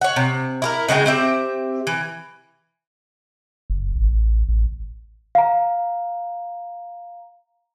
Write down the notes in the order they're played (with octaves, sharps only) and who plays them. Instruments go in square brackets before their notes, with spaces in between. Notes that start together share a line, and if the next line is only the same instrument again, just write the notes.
[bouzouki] C#5 F#5
C3
E4 G4 A#4
C#3 G#3 F#4 G5
C4 G4 E5
E3
[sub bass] F#1
A1
A1
[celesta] F5 A#5